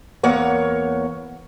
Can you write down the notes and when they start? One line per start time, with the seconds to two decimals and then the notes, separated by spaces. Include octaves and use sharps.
0.23 E2 A#3 C#5 F#5